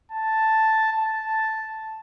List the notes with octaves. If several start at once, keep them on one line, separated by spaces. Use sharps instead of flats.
A5
A5